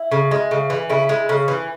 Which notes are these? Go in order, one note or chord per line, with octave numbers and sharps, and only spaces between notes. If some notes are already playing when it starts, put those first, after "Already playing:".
Already playing: E4
C#3
G#3
C#3
E3
C#3 E4
G#3
C#3
E3